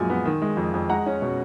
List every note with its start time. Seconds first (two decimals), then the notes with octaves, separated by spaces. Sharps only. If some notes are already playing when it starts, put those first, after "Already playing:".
Already playing: F#2 A#2 F3 G#3 G#5
0.10 B3
0.25 D#3
0.42 G#3
0.57 F2
0.74 F2
0.89 G#3 F#5 A#5
1.06 C#4
1.22 B2